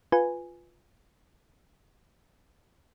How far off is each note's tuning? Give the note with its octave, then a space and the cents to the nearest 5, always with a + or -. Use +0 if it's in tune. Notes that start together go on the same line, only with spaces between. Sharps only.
F4 +0 B4 +0 G#5 -5